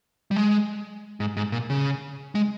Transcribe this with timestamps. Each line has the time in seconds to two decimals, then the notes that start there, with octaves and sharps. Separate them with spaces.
0.31 G3
0.36 G#3
1.20 G#2
1.37 G#2
1.52 A#2
1.70 C#3
2.35 G#3